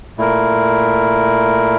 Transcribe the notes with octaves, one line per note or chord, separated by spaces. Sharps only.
A#2 A3 E4 A#4